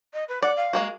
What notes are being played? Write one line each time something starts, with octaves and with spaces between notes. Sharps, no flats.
D#5
B4
D5 F#5
F5
G#3 A#3 F#4